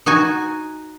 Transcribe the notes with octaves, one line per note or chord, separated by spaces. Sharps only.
D#4 F#4 G#5